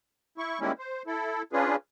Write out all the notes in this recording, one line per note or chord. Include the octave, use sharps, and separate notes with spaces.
E4 C#6
D#3 G3 G#3 A#3 C#4 E4
C5
E4 A4
C#4 D4 F4 G#4 B4